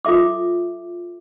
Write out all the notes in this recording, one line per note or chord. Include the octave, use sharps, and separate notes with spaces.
F4 A4 E5 D6